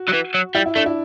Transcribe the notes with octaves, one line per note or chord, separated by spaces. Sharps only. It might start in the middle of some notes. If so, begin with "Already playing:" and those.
Already playing: F#4
F#3
E3
F#3
G3 E4
E4
A3 D4
E4